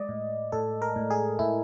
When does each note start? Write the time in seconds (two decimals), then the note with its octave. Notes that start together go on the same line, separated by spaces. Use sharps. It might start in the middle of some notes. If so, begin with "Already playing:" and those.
Already playing: G#3 D5 D#5
0.09 A2
0.52 A2 A4
0.82 A#4
0.96 A2
1.11 G#4
1.39 A2 E4